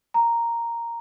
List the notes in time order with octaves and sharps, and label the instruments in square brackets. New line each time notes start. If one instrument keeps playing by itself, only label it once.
[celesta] A#5